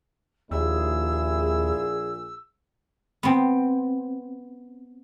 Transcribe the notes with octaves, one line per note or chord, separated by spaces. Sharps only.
A#1 D#2 A#2 E4 G#4 E6
B3 C4